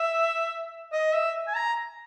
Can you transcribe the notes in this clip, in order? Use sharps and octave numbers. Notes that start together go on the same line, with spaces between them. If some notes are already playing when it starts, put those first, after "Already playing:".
Already playing: E5
D#5
E5
G#5
A#5